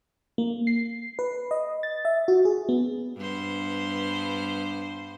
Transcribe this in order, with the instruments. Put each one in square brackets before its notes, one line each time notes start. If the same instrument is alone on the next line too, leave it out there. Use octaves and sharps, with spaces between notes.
[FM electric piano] A#3
C7
B4
D#5
A6
E5
F#4
G#4
B3
[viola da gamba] G2 B3 C5